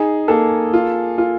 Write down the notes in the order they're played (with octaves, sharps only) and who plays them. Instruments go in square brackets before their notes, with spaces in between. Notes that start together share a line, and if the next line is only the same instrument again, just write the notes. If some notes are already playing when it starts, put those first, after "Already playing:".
Already playing: [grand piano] D#4 [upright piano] G#4
[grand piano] A#3 [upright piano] A4
[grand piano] F4
F4